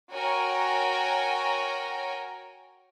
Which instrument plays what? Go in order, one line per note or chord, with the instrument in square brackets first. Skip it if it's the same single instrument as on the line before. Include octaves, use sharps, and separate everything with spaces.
[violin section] F#4 A#4 C#5 G5 G#5